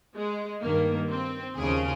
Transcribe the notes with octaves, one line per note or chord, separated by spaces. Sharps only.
G#3
G2 D#3 A#3
C4
D#2 C#3 F3 G#4